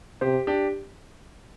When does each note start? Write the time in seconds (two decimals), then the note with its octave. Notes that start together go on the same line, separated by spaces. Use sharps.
0.21 C3 G4 C5
0.47 D4 G4